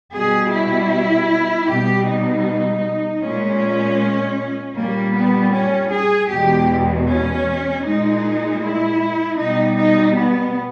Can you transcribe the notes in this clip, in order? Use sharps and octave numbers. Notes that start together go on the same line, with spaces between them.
B2 G3 G#4
E4
B2 G3 G4
D#4
A#2 G#3 C#4
A#2 G3 A#3
B3
C#4
G#4
E2 B2 G#3 G4
C#4
A#2 G#3 D#4
E4
B2 G3 D#4
D#4
B3